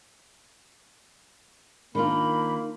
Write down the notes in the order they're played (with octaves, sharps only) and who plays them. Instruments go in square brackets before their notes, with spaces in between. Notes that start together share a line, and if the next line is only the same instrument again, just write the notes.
[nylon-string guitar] D#3 D4 F4 [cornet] A#3 [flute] B5